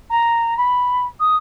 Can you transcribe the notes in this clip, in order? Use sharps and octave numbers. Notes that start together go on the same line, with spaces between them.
A#5
B5
D#6